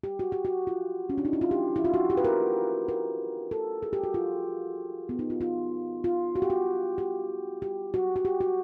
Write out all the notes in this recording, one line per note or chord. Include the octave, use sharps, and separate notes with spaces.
G4
F#4
G4
F#4
F4
C#4
D4
D#4
E4
F4
G4
E4
F4
F#4
G4
B4
A#4
A#4
A4
G#4
G4
F#4
F4
B3
D#4
F4
F4
F4
F#4
G4
F#4
G4
G4
F#4
F#4
G4
F#4